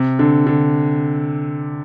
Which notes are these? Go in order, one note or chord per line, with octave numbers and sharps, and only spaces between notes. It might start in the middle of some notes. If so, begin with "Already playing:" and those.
Already playing: C3
D3
D3